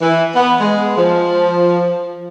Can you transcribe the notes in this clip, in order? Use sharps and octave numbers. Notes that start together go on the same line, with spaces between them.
E3
B3
G#3
F3